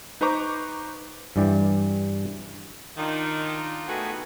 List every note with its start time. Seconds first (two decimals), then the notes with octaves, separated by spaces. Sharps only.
0.21 D#4 B4 C5 A#5 C#6 D6
1.36 G2 E3 D5 G5
2.97 D#3 D4 D#4 F4
3.87 D#3 A3 B3 F#4 G#4 B4